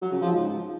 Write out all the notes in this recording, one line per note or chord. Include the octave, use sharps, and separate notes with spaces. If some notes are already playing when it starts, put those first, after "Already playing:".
F#3
C#3
F3
G#2